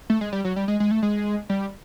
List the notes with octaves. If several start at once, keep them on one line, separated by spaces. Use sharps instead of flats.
A3
G#3
G3
F#3
G3
G#3
G#3
A3
G#3
G3